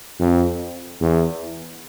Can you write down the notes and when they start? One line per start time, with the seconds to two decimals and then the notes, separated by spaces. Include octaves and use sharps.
0.20 F2
1.01 E2